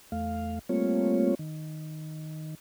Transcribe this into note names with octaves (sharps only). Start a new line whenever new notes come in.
E2 A3 F5
G3 A3 A#3 C4 F4 C#5
D#3